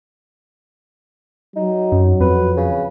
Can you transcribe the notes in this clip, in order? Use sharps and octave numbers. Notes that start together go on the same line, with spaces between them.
F#3 D#4
F#2
F2 B4
C#3